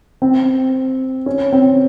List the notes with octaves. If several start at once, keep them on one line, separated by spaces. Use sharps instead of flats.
C4
C#4
C4